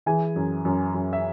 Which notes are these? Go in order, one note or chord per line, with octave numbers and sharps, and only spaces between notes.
E3 G#4 G#5
F#2
F#2
F#2
E5